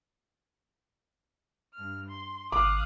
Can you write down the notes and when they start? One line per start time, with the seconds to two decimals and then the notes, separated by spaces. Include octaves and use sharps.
1.73 G2 F6
2.07 C6
2.52 G#1 F5 D6 D#6 F#6